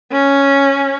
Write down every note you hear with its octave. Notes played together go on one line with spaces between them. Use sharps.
C#4